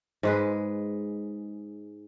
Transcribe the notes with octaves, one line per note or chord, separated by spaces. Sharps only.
G#2 G#3 B4